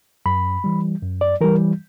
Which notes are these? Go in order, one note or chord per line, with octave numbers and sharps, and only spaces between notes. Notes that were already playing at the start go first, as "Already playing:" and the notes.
F#2 B5
E3 G3
F#2
D5
E3 G3 A#4